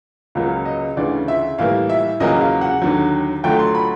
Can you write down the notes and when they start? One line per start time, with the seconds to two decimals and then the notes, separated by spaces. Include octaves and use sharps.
0.35 C#2 C#3 F#3 A#3 F5
0.65 D#5
0.97 D2 C#3 E3 D5
1.28 E5
1.58 A2 E3 G3 A#3 F5
1.90 E5
2.20 E2 C#3 F#3 A#3 D#5
2.41 F5
2.61 F#5
2.82 D#2 D3 F#3
3.44 D2 D3 F#3 A3 G5
3.59 C6
3.75 B5